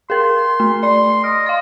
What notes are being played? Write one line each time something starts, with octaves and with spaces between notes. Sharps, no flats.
G#4 A#4 C6
A3
D5 C6
D#5 F6
F5 C6